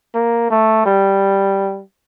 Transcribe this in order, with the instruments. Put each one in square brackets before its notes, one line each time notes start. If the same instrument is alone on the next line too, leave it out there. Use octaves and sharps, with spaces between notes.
[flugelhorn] A#3
A3
G3